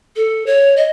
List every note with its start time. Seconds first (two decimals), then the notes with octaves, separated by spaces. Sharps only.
0.16 A4
0.46 C#5
0.77 D#5